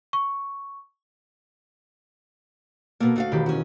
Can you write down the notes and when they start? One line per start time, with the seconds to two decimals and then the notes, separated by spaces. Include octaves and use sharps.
0.13 C#6
3.00 B2 A#3 A4
3.16 D2 F#4 F5
3.31 E1 D#3 G4
3.46 C#4 F#4